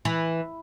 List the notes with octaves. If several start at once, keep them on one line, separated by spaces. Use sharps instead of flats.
E3